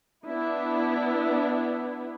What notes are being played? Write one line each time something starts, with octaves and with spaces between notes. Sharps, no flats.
B3 D4 E4